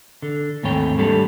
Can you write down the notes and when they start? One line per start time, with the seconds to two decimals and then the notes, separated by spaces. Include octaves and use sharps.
0.22 D3
0.63 D#2 G#2 A3 C4 C#5 G5
0.98 G3 A3 A#3 D4 G4 A4